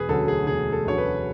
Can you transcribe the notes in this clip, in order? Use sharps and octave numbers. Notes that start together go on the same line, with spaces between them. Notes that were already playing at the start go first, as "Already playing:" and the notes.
Already playing: E1 G#4 B4
D2 D3 F#3 C#4 A4
G#4
E1 G#4
A4
D2 D3 F#3 C#4 C#5
B4